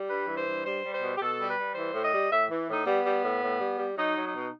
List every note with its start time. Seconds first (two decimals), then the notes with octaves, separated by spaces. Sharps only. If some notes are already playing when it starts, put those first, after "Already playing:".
Already playing: G3
0.09 G2 B4
0.28 E3
0.37 C5
0.47 G2
0.65 G3 C5
0.83 G3
0.93 C5
1.02 B2
1.16 G4
1.21 B2 A4
1.39 G3
1.48 B4
1.58 G3
1.75 E3 C5
1.94 A2
2.03 D#5
2.13 G3
2.31 A2 E5
2.50 E3
2.68 A2 D#4
2.86 G3 B3
3.06 G3
3.23 A2
3.42 A2
3.61 G3
3.79 G3
3.98 F#3 D#4
4.16 F#3
4.26 D#4
4.35 B2